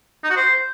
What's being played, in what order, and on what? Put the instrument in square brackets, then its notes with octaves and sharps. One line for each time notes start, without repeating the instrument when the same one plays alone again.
[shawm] D#4
F#4
C5